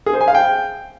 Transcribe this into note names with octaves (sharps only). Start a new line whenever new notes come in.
G#4
C5
G#5
F5
G5